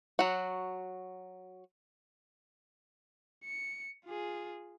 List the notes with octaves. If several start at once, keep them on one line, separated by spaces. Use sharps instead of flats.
F#3 F#4
C#7
F4 G#4